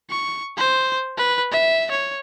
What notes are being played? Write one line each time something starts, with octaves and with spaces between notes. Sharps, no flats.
C#6
C5
B4
E5
C#5